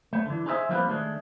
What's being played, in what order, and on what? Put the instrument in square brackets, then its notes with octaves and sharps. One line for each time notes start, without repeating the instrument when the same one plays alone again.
[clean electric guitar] A3
D3 E3
D#4 G#4 C5 D#5 E5
F3 G3 A#3 C4 F4 B4
D#3 G#3 A3 D4